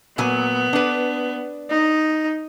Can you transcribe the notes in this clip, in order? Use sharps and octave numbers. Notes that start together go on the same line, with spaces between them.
A#2 F#3 B3 G#5
D4 B4
D#4